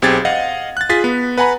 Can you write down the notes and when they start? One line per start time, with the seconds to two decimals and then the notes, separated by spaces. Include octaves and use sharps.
0.02 B1 C4 G4 G#4 G#6 A6
0.25 D#5 F5 F#5
0.77 F#6 A6
0.89 F4 G#4 A6 B6
1.04 B3
1.38 B4 F#5 G#5 A#5 B5